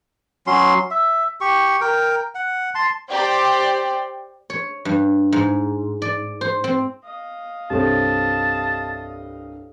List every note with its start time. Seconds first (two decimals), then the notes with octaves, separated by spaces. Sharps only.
0.47 F#3 C#4 C6
0.91 E5
1.41 G4 C#6
1.81 A#4 G5
2.35 F#5
2.75 A5 C6
3.10 G4 C5 D5 G5
4.50 C#5
4.85 G2
5.32 G#2
6.02 D5
6.41 C5
6.64 C4
7.04 D#5 F5
7.70 C2 G2 C4 G4 A4 C#5 A5